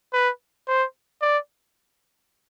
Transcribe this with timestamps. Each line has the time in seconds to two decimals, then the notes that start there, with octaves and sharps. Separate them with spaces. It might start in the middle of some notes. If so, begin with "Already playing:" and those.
0.13 B4
0.68 C5
1.22 D5